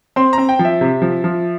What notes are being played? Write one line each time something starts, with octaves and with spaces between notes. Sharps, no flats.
C4 C6
C4 A#5
G5
F3
E5
C3
F3
F3